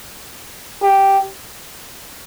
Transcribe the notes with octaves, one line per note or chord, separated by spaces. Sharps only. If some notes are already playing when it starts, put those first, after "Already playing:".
G4